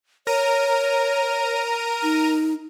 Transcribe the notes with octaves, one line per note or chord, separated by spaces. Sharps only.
A#4 C#5 A#5 D#7
D#4